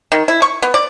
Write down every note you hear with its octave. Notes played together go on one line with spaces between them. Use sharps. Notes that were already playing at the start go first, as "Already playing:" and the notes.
D#3
E4
C#6
B3
D5